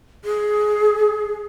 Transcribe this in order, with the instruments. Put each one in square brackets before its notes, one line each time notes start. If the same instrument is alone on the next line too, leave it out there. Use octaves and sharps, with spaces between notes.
[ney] G#4